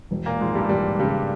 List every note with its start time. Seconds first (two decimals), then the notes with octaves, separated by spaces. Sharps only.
0.11 E1
0.26 A#2 A#3
0.40 G#2 F3 G#3
0.55 G2 G3
0.69 E1 G2 G3
0.99 G2 C#3 G3